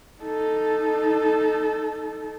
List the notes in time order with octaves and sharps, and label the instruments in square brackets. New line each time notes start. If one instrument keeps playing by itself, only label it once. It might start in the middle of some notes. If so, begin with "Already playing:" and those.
[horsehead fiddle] D#4 A4